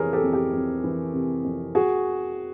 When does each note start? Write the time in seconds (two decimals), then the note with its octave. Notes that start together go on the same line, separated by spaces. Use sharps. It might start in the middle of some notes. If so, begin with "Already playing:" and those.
Already playing: F2 C3 E3 G#4 A#4 C#5
0.13 G4 A4
0.24 F2
0.33 G4
0.53 F2
0.84 E3
1.14 C3
1.44 F2
1.75 F#4 G#4